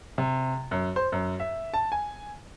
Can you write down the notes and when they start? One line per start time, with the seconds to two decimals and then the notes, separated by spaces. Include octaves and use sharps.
0.18 C3
0.71 F#2
0.96 C5
1.12 F#2
1.40 E5
1.74 A5
1.92 G#5